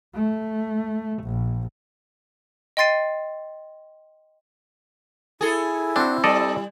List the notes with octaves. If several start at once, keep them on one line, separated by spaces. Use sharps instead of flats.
A3
A#1
D#5 G5 C6 A6 C7 D#7
E4 G#4 A4
C4 D4 F#4
G3 A4 D5 D#5